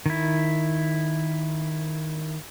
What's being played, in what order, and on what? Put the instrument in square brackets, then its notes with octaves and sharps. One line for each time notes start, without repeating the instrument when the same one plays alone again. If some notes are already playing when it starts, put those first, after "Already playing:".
[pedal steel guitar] D#3 E4